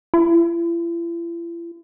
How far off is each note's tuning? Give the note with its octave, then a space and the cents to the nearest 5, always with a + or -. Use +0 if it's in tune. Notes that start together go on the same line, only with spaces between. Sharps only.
E4 +45